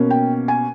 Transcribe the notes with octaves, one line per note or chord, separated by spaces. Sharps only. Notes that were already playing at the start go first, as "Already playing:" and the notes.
Already playing: B2 A#3 C#4
G5
G#5